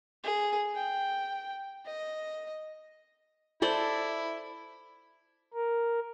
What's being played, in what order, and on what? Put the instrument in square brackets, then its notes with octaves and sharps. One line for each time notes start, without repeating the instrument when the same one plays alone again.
[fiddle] G#4
G5
D#5
[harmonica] E4 [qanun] A4 C5 D5
[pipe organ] A#4